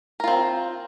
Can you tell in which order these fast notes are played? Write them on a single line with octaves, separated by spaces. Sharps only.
A#4 F4 C4